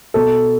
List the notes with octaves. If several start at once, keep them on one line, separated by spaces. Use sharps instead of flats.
B2 A4